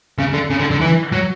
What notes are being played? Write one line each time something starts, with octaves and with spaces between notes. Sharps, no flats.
C#3
D3
C#3
D3
D3
E3
F#3